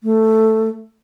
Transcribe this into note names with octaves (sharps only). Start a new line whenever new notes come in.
A3